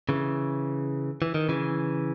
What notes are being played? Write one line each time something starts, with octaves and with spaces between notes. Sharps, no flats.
C#3 E3
E3
D#3
C#3 E3